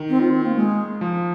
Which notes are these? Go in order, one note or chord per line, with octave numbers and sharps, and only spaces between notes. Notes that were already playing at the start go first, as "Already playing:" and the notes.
Already playing: D#3
C4
F4
C4
A#3
G#3
F3